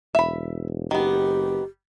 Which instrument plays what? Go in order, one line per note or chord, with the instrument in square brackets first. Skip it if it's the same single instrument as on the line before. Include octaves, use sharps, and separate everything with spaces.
[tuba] E1 [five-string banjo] E5 B5
[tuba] F#1 [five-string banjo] D#3 B3 [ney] G4